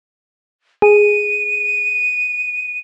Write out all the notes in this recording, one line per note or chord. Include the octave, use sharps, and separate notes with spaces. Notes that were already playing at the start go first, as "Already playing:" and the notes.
G#4 D#7